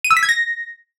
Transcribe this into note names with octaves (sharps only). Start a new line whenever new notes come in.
D#7
E6
B6
G#6
A#6